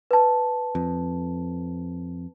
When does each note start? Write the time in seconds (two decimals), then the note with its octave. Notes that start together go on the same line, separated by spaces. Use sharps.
0.11 B4 A5
0.75 F2